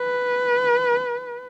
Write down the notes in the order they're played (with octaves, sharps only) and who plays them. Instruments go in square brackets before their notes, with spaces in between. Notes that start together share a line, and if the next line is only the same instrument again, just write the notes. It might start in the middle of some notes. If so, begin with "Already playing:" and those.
Already playing: [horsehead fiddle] B4